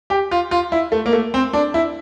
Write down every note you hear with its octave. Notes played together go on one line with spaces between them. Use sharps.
G4
F4
F4
E4
A3
A#3
A3
C4
D4
E4